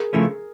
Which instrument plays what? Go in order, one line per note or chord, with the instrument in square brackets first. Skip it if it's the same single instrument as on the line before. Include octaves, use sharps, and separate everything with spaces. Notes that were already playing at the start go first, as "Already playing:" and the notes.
Already playing: [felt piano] G#4 A#4
[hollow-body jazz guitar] C#3 F3 A3 C#4 E4